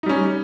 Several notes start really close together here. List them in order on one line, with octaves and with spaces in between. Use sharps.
D#4 G3 C#4